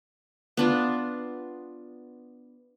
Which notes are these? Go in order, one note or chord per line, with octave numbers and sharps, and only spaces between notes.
B3 D4 F4